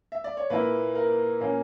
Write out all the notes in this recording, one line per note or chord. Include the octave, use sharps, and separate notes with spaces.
E5
D5
C#5
A#2 A#3 E4 B4
A#4
A#2 A#3 C#4